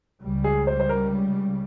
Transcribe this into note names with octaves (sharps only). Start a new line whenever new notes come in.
C#2 C#3 G3
G#4
C5
C5
A#4